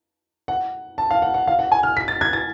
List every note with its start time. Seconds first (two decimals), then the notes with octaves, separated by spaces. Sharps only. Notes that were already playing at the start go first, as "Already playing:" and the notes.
0.48 F#5
0.98 A5
1.11 F5
1.22 F#5
1.34 F#5
1.47 F5
1.59 F#5
1.72 G#5
1.83 F6
1.97 B6
2.08 A6
2.21 G#6
2.33 A6